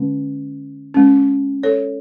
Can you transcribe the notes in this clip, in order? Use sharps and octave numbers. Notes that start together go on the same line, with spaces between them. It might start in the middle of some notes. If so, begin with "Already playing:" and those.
Already playing: D3 G#3 C#4
G#3 C#4
A4 C#5